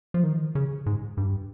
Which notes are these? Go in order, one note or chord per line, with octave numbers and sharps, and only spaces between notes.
F3
D#3
C#3
G#2
G2